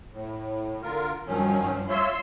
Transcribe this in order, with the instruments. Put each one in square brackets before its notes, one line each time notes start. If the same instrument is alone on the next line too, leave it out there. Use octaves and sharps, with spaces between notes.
[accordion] A2
D3 F4 A#4
[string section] G2 F3 [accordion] D#3 F#3 C#4
[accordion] F4 C#5 E5 [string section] C6 E6